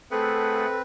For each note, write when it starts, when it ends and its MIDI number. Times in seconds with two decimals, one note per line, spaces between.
0.11 0.66 57
0.11 0.82 60
0.11 0.66 68
0.11 0.77 69
0.11 0.82 71
0.11 0.66 78